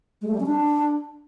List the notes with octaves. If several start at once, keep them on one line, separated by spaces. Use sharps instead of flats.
G#3
A3
G3
C#4
D4